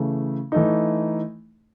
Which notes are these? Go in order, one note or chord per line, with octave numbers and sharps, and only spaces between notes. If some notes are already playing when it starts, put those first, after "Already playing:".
Already playing: C#3 E3 A3
E3 A3 D#4